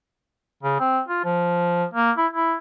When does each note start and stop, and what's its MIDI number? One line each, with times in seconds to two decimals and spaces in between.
0.63 0.76 49
0.80 1.01 60
1.08 1.22 65
1.24 1.85 53
1.94 2.11 58
2.17 2.27 64
2.33 2.55 64